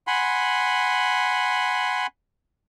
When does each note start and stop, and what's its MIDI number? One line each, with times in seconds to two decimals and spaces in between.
0.07 2.07 78
0.07 2.07 80
0.07 2.07 83
0.07 2.07 84